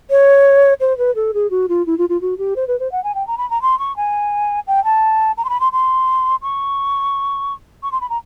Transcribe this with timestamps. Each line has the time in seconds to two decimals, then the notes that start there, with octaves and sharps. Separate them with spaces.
0.10 C#5
0.80 C5
0.98 B4
1.15 A4
1.34 G#4
1.50 F#4
1.69 F4
1.86 E4
1.98 F4
2.09 F4
2.21 F#4
2.38 G4
2.56 C5
2.68 B4
2.80 C5
2.92 F#5
3.04 G#5
3.15 G5
3.27 A#5
3.38 B5
3.50 A#5
3.62 C6
3.79 C#6
3.96 G#5
4.67 G5
4.84 A5
5.37 A#5
5.45 C6
5.49 B5
5.60 C6
5.72 C6
6.42 C#6
7.83 C#6
7.92 C6
8.01 B5
8.10 A#5